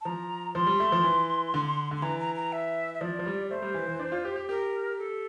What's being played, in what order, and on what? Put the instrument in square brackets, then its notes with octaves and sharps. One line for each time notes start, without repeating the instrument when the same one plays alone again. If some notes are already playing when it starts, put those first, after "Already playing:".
[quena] A5
[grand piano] F3 [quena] A#5
[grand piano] F3 [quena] C6
[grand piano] G3
A3
F3
E3
D3
[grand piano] D3 [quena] C6
[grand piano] E3 [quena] A#5
[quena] A#5
A#5
E5
E5
[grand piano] F3 [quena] D5
[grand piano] F3
G3
[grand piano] A3 [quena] C5
[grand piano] G3
E3
E3
D4
F4
G4
G4
[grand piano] G4 [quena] A#4
[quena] A4